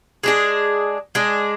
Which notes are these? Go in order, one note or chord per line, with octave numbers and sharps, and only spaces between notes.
G#3 D4 G#4
G#3 D4 G#4